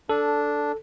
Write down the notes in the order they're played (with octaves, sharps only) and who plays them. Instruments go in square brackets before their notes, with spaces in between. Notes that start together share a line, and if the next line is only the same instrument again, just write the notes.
[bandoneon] D4 [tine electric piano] A4